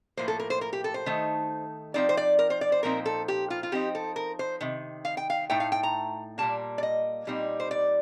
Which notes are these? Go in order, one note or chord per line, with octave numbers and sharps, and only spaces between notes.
A2 F3 A#3 C5
A4
A#4
C5
A#4
G4
A4
C5
D#3 A3 D#4
F3 C4 D#4 D5
C5
D5
A#4
C5
D5
C5
A#2 F3 C4 D#4 A#4
A4
G4
F4
F4
F3 C4 D#4 G4
A4
A#4
C5
C3 D#3
F5
G5
F5
A2 A3 D#4 G5
F5
G5
A#5
A#2 G3 A#3 A5
D5
D#5
A#2 G3 C4 D#4
C5
D5